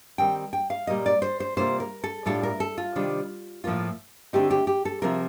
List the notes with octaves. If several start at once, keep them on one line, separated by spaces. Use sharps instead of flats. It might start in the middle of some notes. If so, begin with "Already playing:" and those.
D#3 G3 C4 G5
G5
F5
A#2 G3 A#3 D#5
D5
C5
C5
C3 G3 A#3 F4 C5
A#4
A4
A2 G3 D4 F4 A4
A#4
A4
F4
C3 D#3 G3 D4
A2 F3 A#3 F4
D3 A3 C4 D#4 G4
G4
G4
A4
C3 F3 C4 F4 A#4